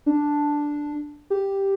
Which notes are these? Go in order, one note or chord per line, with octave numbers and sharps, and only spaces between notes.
D4
G4